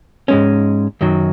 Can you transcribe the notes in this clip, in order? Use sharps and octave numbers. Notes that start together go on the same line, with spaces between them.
G#2 G#3 C#4
F#2 D#3 F#3